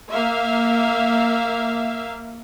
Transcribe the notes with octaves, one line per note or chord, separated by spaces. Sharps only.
A#3 E5 F5